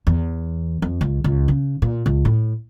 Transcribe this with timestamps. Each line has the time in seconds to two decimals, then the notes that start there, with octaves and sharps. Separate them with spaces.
0.07 E2
0.82 F2
1.01 C#2
1.24 C#2
1.48 C#3
1.82 A#2
2.06 C#2
2.25 A2